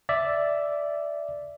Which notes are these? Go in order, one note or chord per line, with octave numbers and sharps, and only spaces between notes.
D5 E5